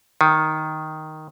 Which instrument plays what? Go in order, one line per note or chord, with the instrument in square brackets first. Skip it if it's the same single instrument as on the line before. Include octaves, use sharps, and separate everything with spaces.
[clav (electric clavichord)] D#3